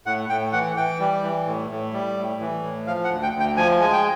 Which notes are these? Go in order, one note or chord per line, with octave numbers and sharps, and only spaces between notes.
A2 F#5
A2 G5
E3 F#5
E3 G5
G3
E3
A2
A2
G3
A2
E3
A2
F3 F5
F#5
D2
G5
D2
G5
F3 G#5
G#3 G#5
G5